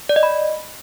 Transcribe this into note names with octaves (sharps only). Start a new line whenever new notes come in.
D5
D#5
B5